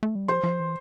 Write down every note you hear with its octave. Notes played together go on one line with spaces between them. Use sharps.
A3
G3
F3 C5 C6
F3
E3